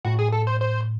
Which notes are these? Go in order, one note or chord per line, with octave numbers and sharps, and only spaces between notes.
A2 F#4
G#4
A4
C5
C5